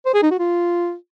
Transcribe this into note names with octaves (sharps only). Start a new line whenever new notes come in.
C5
G#4
D#4
F#4
F4